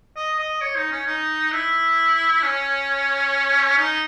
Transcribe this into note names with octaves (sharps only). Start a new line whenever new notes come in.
D#5
D#5
C#5
D#4
C#4
D#4
E4
C#4
D#4